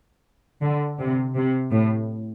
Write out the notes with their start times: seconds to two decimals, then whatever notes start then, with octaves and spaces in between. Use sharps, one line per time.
0.62 D3
0.99 C3
1.35 C3
1.71 A2